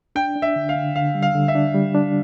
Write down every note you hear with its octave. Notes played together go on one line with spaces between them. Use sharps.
D4 G5
D4
E5
D3
F5
D3
D3 F5
G3
F5
D3
E5
D4
G3
D4